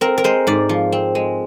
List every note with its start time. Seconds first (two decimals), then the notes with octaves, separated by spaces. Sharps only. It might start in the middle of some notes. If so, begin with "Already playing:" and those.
0.01 C4 A#4
0.18 A#4
0.24 G#3 C5
0.47 G#2 D5
0.69 F3
0.92 C4
1.15 G#3